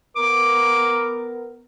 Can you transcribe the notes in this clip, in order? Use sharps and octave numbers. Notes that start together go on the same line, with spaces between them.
B3 A#4 D6